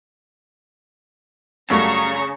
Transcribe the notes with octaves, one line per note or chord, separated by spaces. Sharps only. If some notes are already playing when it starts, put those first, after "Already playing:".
F#2 C#3 G3 A3 A#5 C#6